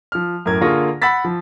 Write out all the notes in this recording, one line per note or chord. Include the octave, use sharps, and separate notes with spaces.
F3 F6
F#2 A2 A#4 G#6
D3 A#3 F4 G#4 C#6 A#6
F#5 B5 E6 A6 B6
F3